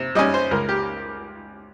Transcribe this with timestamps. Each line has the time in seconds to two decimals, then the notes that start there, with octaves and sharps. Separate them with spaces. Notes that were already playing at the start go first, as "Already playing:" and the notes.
Already playing: C3
0.15 G3 C#4 D#5
0.34 C5
0.51 C#2 A#4
0.69 G4